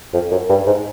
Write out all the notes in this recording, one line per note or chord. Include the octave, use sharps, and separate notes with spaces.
F2
F#2
G2
G#2